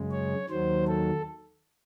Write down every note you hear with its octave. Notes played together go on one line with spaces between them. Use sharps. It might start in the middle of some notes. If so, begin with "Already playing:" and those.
Already playing: F#2 C#3 G#3
C#5
D#2 D#3 F#3 C5
A4